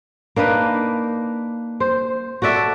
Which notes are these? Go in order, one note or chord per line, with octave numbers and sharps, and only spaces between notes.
A#3 D4 D#4 B4
C5
F#4 A4 D5 E5